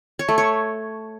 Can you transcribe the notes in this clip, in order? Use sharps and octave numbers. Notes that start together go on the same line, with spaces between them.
C#5
A3
C#5